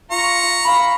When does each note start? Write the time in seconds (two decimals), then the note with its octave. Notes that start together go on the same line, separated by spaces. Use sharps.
0.11 F4 A#5 C#6
0.65 F5 B5